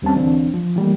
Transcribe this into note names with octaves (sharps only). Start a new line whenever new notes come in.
D#2 G3 C4 C#4 A5
D2 D3 E3 C4 D4
F3
E3 G3 A3 A#3